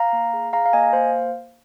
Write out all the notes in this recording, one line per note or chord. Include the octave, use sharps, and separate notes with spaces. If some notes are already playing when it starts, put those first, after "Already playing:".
Already playing: F5 A#5
A#3
G#4
G#4 F5 A#5
F5
A#3 D#5 G#5
A#3 C5 F5